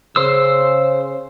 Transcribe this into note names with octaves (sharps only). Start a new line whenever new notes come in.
C#3 C5 E6